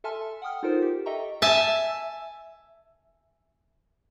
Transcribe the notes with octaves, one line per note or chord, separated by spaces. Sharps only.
A4 E5 G#5 A5 C6 F6
F#5 G5 D#6 F6
D#4 F4 A4 A#4 C5
G4
A4 D#5 E5 G5 A#5 C#6
E5 G#5 A5